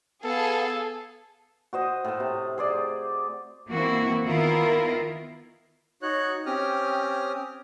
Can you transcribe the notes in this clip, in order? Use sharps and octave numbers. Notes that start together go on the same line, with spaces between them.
B3 G#4 A4 F5 A5
F#4 C5 D#5
A2 A5
C3
G#4 C5 D5
E3 A#3 C4 E4 F#4
D#3 B3 E4 F4 A#4
D#4 F#4 C#5 F#6
C4 C#4 G4 D#6 F6